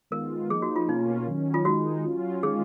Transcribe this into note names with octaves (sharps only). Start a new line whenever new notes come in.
D#3 G#3 B3 F4 A#4
F3 A#3 D#4 G#4
F#4
F4
B2 A#3 C#4 D#4 F4
D#3 F#3 C#4
F4
D#3 G#3 D#4 F#4
F#3 C#4 F4
D#3 G#3 C#4 F4 G#4